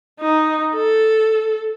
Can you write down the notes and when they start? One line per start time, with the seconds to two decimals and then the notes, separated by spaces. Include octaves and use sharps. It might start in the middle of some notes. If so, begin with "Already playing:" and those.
0.20 D#4
0.75 A4